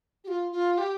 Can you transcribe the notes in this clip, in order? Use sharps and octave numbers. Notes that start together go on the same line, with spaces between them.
G4
F4
F4
G4